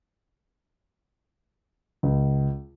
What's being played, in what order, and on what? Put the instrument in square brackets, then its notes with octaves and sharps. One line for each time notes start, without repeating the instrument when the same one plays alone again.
[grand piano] C#2